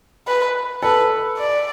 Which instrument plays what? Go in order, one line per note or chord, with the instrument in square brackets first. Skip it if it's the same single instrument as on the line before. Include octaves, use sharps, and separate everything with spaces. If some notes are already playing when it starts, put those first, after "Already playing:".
[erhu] B4
[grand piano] A4 [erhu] B4
[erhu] D5